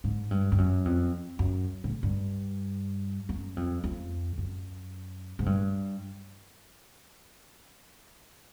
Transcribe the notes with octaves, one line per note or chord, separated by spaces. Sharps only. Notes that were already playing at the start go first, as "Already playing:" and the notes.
G#2
G2
G2
F#2
F2
F#2
A2
G2
F#2
F2
F2
F#2
G#2
G2